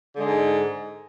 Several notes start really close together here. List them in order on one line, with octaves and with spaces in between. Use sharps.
D3 G#3 G#2